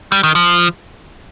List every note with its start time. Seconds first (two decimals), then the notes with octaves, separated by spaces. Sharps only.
0.12 G3
0.23 D#3
0.35 F3